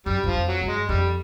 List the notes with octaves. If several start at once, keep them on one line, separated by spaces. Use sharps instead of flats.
F#2 G3
F#2 F3
F2
F#3
G2
G#3
F2 G3